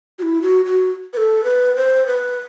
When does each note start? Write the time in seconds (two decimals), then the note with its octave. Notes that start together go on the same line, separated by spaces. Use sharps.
0.19 F#4
0.23 E4
0.42 F#4
0.65 F#4
1.13 B4
1.17 A4
1.44 B4
1.76 C5
2.07 B4